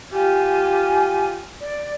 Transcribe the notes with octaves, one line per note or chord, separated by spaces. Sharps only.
F4 G4 G#5
D5